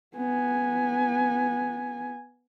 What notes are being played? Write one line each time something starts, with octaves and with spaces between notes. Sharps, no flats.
B3 G#5